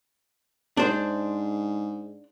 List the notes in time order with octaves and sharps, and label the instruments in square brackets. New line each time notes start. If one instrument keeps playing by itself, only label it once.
[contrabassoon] G#2 [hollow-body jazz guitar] D4 C5